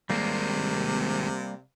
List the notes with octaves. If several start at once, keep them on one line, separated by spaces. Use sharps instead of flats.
D#2 C3 G3 G#3 A#3